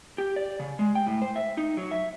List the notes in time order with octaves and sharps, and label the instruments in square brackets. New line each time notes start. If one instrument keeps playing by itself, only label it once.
[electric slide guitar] G4
D5
C#3
G#3
G5
A2
C5
E5
D#4
F#3
E5